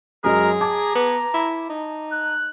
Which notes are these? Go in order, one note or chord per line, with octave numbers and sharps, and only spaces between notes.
F#2 F#3 G#3 G#4 A#4
A5 A#5 D6 G#6
B3
E4
D#4
F#6